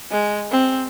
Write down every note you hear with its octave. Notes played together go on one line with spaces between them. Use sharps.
G#3
C4